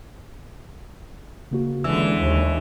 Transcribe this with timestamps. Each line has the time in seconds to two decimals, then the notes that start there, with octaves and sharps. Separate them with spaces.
1.51 C#3 A#3 F#4
1.84 C#2 D3 E3 E6
2.18 D#2